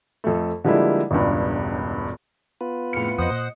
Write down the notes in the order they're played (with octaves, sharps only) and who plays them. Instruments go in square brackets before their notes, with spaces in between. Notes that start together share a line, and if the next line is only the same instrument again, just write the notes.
[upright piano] F2 A3
D3 F3 G3 G#3 A#3 E4
E1 C#2 G2
[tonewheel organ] B3 F4 B4
[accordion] F2 C#3 F6 [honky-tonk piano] A2 C#7
[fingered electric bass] F2 [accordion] C5 F#5 [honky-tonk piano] D#5 D#6
[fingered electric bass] A#2